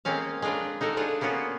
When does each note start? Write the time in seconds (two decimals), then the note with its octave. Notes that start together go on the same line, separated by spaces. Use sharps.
0.05 G#3 A#3 C4 C#4 F5
0.42 G#3 D4 F4 A#4 B4
0.81 D#4 F#4 A4 A#4
0.97 D4 F4 G#4 C#5
1.21 A#3 B3 C#4 F4 F#4